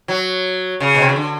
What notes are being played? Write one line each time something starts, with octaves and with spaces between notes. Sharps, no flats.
F#3
C#3
B2
C3
C#3
D3